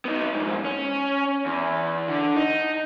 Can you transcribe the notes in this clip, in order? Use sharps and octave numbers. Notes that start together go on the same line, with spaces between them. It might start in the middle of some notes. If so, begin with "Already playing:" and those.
B3 D#4
F2 G#2
C#4
E2
D3
D#4